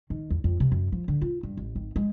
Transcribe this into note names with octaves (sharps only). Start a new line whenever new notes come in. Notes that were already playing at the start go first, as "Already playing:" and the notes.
D#3
E2
F2
C3
F#2
F3
D3
F4
G2
A1
G#1
G#3